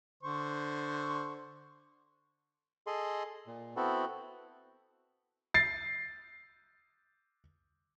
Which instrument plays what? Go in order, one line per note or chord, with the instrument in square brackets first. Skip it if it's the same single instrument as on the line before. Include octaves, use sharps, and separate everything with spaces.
[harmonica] D3 C5 C#6
[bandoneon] G#4 A4 D#5 C6
A#2
B3 C4 E4 F#4 A4
[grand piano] A6 C7